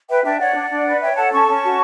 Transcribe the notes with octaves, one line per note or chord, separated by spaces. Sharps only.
B4 E5 G5
D4 E5 G5
C#5 D5 F#5
D4
D4
B4
C#5 E5 G5
A4 F#5 A5
C#4 A5 C#6
C#4
F#4